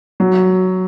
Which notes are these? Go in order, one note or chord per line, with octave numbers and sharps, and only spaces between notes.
F#3